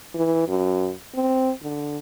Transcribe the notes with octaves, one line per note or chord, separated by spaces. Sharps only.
E3
F#2
C4
D3